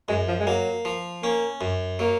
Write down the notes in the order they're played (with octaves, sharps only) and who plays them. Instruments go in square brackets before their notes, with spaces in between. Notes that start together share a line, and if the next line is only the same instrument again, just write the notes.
[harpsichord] F#2 [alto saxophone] G#3
[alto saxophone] F3
G#3
[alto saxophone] F#3 [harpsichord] A#3
[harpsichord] F3
[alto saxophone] A#3 [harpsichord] C#4
[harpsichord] F#2
[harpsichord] F#3 [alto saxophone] A#3